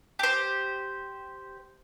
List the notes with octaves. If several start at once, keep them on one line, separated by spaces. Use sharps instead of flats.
G4 C5